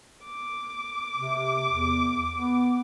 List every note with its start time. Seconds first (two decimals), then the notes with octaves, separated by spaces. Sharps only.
0.24 D6
1.15 C3
1.67 E2
2.33 B3